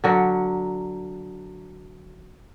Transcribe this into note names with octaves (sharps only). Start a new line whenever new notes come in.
D3 F#3 A#4